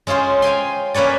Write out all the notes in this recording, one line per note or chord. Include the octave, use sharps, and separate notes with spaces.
G#3 C#4 F4 G#4 C5
F5 G5 G#5 C6
A#3 C#4 B4 C#5 D5